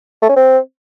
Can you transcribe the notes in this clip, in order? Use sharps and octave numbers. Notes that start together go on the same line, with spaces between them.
A3
C#4
C4